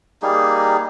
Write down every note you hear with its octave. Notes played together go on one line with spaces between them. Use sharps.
G3 A#3 D#4 G#4